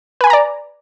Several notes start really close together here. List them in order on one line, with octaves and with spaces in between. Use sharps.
B4 G#5 B5 A#5 D5